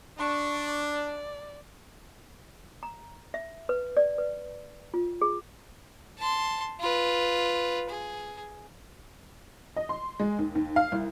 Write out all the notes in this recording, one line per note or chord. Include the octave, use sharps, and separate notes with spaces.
D4 C#6
D5
A#5
E5
B4
D5
B4
F4
G#4
A5 C6
F4 B4
G#4
D#5
C6
G#3
D#2
D#2
F5
C2